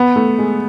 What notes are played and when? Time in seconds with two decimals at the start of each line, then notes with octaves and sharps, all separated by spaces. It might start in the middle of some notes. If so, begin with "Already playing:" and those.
Already playing: B3
0.16 A3
0.39 G#3